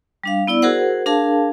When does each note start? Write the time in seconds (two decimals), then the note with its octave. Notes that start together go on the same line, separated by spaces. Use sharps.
0.24 G3 D4 F5
0.47 B3 E4 D5 E6
0.62 F#4 G#4 A#4 C5 F#5
1.06 D4 G#4 A#4 F5 A5